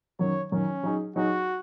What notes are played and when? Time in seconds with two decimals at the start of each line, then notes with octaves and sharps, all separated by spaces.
0.19 F#2 D#3 F#3 C#5
0.52 F#2 D#3 F#3 C#4
0.83 F#3 D#4 G#4
1.16 F#3 D#4 F#4 G#4